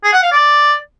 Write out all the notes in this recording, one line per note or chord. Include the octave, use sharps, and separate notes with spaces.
G#4
F#5
F5
D5